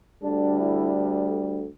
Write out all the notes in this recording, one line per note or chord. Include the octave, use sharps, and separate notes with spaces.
D2 D3 G3 D4
E4